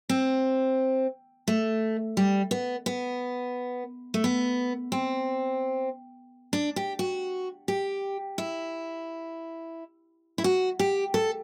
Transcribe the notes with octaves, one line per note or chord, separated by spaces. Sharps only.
C4
A3
G3
B3
B3
A3
B3
C4
D4
G4
F#4
G4
E4
E4
F#4
G4
A4